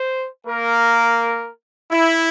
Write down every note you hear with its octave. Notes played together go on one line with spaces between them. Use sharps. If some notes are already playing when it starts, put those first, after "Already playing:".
Already playing: C5
A#3 A#4
E4